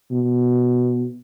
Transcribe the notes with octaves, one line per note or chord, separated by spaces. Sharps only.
B2